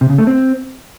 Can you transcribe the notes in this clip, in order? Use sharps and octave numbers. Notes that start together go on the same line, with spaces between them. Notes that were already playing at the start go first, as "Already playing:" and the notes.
C3
C#3
A3
C4